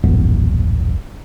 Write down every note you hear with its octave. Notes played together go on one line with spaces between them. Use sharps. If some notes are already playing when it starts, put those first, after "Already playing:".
D#1 A1 F#2 B3